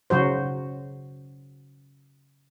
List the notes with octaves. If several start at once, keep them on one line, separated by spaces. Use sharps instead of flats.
C#3 F#3 F#4 C5